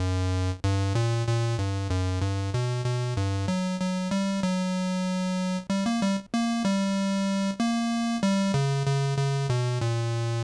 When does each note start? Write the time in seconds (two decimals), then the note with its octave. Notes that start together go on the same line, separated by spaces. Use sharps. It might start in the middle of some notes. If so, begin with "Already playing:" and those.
Already playing: F#2
0.64 G2
0.95 A#2
1.27 A#2
1.59 G2
1.90 F#2
2.21 G2
2.54 B2
2.85 B2
3.17 G2
3.48 F#3
3.80 F#3
4.11 G3
4.43 F#3
5.70 G3
5.86 A#3
6.01 G3
6.34 A#3
6.65 G3
7.60 A#3
8.23 G3
8.54 C#3
8.87 C#3
9.18 C#3
9.50 B2
9.81 A#2